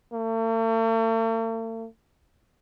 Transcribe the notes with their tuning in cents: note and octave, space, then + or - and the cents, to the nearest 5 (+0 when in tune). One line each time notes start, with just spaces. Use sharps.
A3 +45